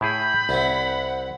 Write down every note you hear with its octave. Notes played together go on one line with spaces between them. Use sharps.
A2 E4 G#4 B5 G6
C2 C4 E4 F#5